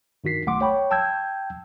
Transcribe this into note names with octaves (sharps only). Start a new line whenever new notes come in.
G2 D#3 F#4 B6 C7
B1 A3 F#5 C6 D6
C#5 G5 B5 C#6
G5 A5 E6 G6 G#6